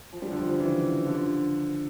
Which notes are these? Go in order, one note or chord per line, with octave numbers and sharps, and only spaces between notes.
F3
G3
D3 F3
F3
C#3 E3
D3 F3